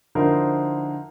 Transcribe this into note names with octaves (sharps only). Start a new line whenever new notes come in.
D3 F3 D#4 E4 A#4 C5